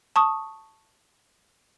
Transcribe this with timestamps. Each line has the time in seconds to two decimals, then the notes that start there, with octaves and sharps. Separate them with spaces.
0.16 A5 C#6 D#6